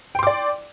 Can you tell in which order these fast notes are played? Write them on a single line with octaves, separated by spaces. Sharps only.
G5 C6 D6 D5